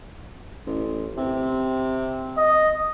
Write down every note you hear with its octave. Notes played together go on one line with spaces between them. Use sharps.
A1
C3
D#5